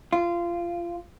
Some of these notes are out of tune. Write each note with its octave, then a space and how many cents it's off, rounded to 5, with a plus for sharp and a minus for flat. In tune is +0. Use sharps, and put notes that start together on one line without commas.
F4 -20